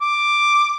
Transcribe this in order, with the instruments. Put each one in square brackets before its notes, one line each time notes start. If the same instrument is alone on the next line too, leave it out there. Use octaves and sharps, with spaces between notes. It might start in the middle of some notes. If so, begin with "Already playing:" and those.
[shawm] D6